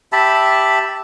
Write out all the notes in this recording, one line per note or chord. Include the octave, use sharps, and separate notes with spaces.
G4 E5 A5 B5